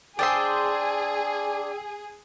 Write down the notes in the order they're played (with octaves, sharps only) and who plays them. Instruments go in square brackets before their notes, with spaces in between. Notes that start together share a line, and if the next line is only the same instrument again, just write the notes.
[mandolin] D4 C5 C6 [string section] G#4 [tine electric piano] G5 D#6 E6